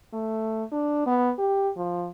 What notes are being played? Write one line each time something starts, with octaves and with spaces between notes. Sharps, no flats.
A3
D4
B3
G4
F3